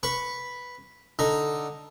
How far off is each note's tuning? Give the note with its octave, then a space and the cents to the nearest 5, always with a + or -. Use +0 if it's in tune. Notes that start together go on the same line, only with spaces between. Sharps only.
B4 -5 C#6 +0
D3 +0 D#4 +0